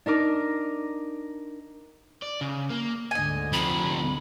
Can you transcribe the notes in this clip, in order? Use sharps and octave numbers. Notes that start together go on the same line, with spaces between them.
D4 D#4 A#4 D6
D5
C#3
A#3
D2 G#2 D3 D#5 G#5
C3 F3 B5